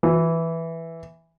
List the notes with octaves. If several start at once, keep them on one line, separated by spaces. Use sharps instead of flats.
E3